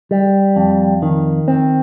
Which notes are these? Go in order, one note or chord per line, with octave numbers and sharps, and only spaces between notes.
G3
F2
D#3
C4